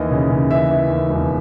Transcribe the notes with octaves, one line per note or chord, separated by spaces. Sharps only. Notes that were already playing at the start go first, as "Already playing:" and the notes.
Already playing: D#2 E3 D#5
C#3
C#3
E3 E5
E3
D#2
E1